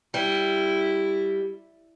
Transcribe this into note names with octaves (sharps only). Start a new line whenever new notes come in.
G3 E4